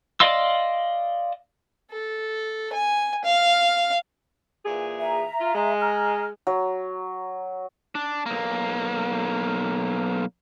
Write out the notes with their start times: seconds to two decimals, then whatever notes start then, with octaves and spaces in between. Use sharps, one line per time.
0.20 D5 D#5 F5 C6 E6
1.92 A4
2.72 G#5
3.24 F5
4.66 A#2 E3 G#4
5.00 E5 A#5
5.40 F4
5.54 G#3
5.81 A#5 F6
6.47 F#3
7.95 D4
8.26 B1 A#3